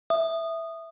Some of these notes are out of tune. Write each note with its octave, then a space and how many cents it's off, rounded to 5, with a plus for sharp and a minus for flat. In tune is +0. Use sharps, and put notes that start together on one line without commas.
E5 +0 D#6 -15